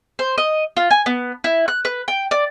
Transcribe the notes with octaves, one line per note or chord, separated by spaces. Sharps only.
C5
D#5
F4
G#5
B3
E4
F#6
B4
G5
D5